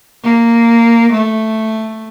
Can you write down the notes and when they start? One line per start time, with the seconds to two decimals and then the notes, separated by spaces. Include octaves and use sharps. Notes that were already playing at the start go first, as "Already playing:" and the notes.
0.23 A#3
1.13 A3